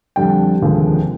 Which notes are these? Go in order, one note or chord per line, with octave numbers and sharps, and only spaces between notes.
F2 D3 G3 G5
F1 D#2 D3 F3 G#3